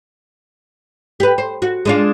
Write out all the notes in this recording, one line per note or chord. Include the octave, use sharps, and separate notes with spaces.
G4 B4
C5
F#4
G#3 D4 F4